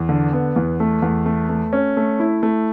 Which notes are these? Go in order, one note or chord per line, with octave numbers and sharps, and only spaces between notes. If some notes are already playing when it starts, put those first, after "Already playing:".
Already playing: E2
D3
B3
E2
A3
E2
A3
A3
C#4
A3
E4
A3